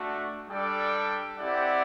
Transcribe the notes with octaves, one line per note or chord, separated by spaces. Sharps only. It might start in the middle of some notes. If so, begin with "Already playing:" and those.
Already playing: A3 D4 F#4
G3 D4 A4 D5 G5
C4 E4 G4 D5 F#5